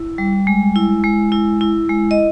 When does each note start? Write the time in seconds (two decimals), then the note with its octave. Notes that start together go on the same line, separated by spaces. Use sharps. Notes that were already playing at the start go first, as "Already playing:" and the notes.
Already playing: E4
0.18 G3
0.47 G#3
0.76 E4
1.04 G#3
1.32 E4
1.61 E4
1.89 G#3
2.11 D#5